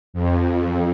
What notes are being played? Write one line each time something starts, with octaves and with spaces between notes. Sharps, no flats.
F2